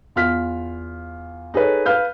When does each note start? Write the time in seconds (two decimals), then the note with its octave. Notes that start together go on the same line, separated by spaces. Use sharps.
0.16 E2 F4 F6 B6
1.54 D#4 G#4 A4 B4 C#5
1.86 B4 F5 F6 G6